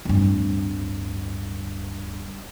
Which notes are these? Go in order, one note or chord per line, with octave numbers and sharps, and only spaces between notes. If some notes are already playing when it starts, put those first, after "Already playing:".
D1 G2